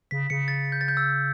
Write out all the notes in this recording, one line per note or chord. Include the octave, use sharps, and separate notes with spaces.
C#3 B6
C#3 C#7
A6
G6
A6
G6
E6